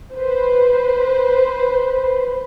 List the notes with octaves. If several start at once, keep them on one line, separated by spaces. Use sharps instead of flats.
B4 C5